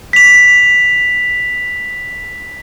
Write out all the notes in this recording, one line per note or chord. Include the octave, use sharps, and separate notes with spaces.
B6 F7